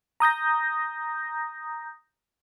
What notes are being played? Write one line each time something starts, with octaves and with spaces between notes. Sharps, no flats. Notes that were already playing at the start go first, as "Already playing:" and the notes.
A#5 D#6 G6 A#6